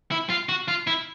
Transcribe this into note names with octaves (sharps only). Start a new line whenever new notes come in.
E4
F4
F#4
F4
E4